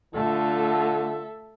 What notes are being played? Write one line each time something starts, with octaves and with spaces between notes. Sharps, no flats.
D3 A3 F4 A4 E5